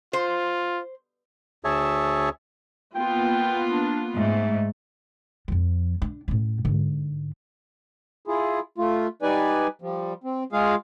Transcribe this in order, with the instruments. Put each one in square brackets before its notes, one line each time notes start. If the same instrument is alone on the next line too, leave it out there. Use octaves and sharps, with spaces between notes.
[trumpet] F4 [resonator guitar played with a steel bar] C5
[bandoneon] D2 G#4 C#5 E5 A5
[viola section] A#3 B3 F4 [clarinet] G5
[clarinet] D4
[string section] G#2 [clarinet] A3
[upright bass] F2 F3
D4
A2 C#4
G#2 D3
[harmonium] E4 F4 G#4
A3 F4
G3 D#4 B4 D5 G#5
F3 G3
C4
G#3 F4 G#4 F5